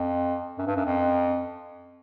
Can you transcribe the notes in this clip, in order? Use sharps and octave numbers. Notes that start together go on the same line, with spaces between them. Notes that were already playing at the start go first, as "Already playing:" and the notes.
Already playing: F2
F#2
G2
F#2
F2